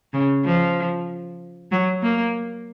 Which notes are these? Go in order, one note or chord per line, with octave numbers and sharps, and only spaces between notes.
C#3
F3
F#3
A#3